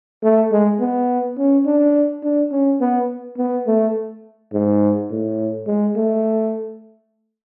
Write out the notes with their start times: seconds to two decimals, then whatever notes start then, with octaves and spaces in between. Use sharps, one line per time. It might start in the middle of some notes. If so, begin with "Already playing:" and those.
0.23 A3
0.52 G#3
0.80 B3
1.38 C#4
1.66 D4
2.23 D4
2.52 C#4
2.81 B3
3.37 B3
3.67 A3
4.53 G#2
5.10 A2
5.67 G#3
5.96 A3